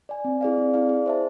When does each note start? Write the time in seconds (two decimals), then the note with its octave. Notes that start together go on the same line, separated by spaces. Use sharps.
0.09 D5 G#5
0.25 C4
0.41 E4 G#4 D5 F5
0.58 C4
0.74 E4 G#4 D5 F5
0.89 G#4
1.06 C5 E5 A5